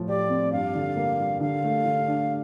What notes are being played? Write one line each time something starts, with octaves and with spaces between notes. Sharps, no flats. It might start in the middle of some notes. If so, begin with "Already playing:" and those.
Already playing: A2 F3
G4 D5
C4
G2 F5
D3
A#3
G3
D3 F5
A3
D3
D4